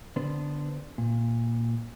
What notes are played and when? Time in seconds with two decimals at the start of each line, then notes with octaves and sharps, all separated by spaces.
0.16 D3 B3 D4 B4 C5
0.98 A#2